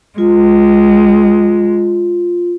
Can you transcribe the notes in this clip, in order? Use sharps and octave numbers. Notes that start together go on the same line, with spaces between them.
G#3 F4